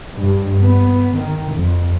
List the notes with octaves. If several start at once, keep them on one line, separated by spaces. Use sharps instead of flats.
G2
B3
D#3
F2